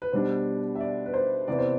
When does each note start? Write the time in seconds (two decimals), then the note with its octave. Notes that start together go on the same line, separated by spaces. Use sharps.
0.02 B4
0.12 B2 G3 D4 C5
0.75 E5
0.80 D5
1.06 B4
1.14 C5
1.48 C3 E3 B3 D5
1.59 C5